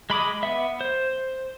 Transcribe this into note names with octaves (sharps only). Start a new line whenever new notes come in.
G#3 B5 D6 D#6
B3 E5
C5